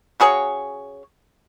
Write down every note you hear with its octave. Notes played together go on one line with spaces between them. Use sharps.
C#3 F#4 G#4 C#5